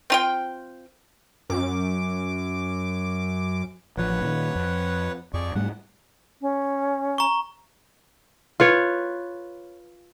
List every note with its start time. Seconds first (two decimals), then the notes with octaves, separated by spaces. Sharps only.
0.10 C4 F4 G5
1.50 F#2 D6
3.97 A1 F3 B4 C#5 F#5
4.22 A#2 D#3
4.55 F2
5.34 F2 G#4 D5 C#6
5.55 G#2 G3 A3 F#5
6.41 C#4
7.18 A#5 C#6
8.60 F4 B4 C#5